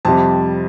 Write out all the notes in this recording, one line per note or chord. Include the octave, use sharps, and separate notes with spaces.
F2 C3 G3 A5